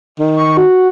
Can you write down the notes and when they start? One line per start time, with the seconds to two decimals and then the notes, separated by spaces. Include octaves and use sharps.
0.19 D#3
0.37 C#6
0.57 F#4